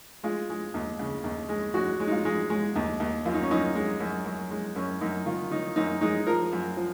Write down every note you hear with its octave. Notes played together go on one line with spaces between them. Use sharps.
G#3 F4
G#3
D#2
C#3
D#2
G#3
G#3 F#4
G#3
D#4
F4
G#3
G#3
D#2
D#2
F#2 F4
D#4
C#4
F#2 D#4
G#3
F#2
F#2
G#3
F#2 C#4
F#2 D#4
D#3 F4
D#3 D#4
F#2 D#4
G#3 D#4
F3 A#4
F#2
F3